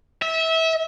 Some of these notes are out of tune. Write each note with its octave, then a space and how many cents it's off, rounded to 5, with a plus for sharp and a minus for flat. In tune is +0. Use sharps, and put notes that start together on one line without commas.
E5 -25